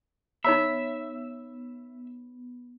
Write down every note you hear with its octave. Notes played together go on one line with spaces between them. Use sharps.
B3 D#4 C#5 E5 B5